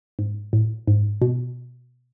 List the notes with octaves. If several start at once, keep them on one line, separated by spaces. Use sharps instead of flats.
G#2
A2
G#2
B2